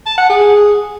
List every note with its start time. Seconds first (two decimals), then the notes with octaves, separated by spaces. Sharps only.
0.06 A5
0.18 F#5
0.29 G#4